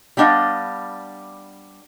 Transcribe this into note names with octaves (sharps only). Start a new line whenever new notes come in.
G3 B3 D4 D#5 F5